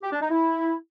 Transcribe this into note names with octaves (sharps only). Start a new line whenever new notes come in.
G4
D4
D#4
E4